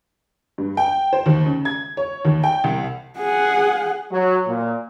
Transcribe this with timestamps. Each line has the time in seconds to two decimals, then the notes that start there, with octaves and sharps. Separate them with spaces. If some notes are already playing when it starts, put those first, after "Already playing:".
0.58 G2
0.77 G5
1.13 C5
1.26 D#2
1.46 C#3
1.65 G#6
1.97 C#5
2.25 D#2
2.44 G5
2.64 C2
3.18 G#4 F#5
4.11 F#3
4.47 A#2